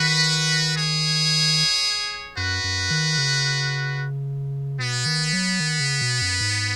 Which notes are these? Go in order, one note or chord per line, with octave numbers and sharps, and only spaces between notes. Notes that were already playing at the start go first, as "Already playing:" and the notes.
Already playing: D#3 F#4 B4
G#4 C#5
F#2 F#4 B4
F#2
D#3
C#3
B2 B3
D#3
F#3
D#3
C#3
B2
F#2
G#2